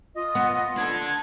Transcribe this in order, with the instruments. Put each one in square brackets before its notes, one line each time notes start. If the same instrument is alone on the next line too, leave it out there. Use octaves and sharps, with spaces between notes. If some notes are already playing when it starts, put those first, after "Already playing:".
[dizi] F4 [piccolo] D#5
[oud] B3
[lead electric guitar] D4 A4 [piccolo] G#6